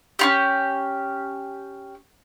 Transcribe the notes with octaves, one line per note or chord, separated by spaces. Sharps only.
C#4 F4 G4